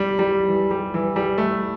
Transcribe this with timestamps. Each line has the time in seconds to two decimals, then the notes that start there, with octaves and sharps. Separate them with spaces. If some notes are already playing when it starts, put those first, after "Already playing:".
Already playing: G3
0.19 G3
0.48 E3
0.71 G3
0.94 E3
1.16 G3
1.38 A3